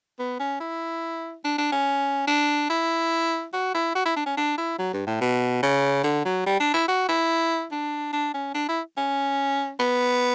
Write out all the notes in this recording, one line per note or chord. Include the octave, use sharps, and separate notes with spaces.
B3
C#4
E4
D4
D4
C#4
D4
E4
F#4
E4
F#4
E4
D4
C#4
D4
E4
F#3
G2
A2
B2
C#3
D3
F#3
G3
D4
E4
F#4
E4
D4
D4
C#4
D4
E4
C#4
B3